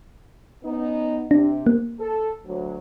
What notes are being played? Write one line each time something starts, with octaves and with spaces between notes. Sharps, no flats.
B3 C#4 D#4
C3 D4
A#3
A4
D2 F#3